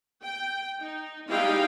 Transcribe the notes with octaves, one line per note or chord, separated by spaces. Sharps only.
G5
D#4
G3 G#3 D#4 E4 F5 G5